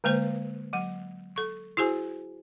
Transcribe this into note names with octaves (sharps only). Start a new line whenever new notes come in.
D3 G#3 A#3 B4 C5 F5
F#3 F#5
A4 C#6
E4 F#4 G#4 C5 G#5